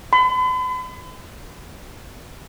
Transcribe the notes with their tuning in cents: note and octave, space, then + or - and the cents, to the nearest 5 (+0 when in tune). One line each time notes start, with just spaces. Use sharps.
B5 +45